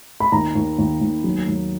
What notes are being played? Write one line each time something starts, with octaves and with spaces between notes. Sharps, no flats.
B5
D#2 A#5
D#2
D#2
D#2
F#3
D#2